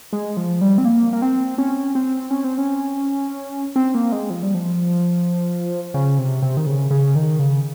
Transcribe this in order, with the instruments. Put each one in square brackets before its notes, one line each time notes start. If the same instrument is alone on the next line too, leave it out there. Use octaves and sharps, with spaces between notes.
[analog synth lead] G#3
F3
G3
C4
A#3
A#3
C4
C#4
C4
C#4
C4
C#4
C4
A#3
G#3
F3
G3
F3
C#3
C3
C3
D#3
C#3
C#3
D#3
C#3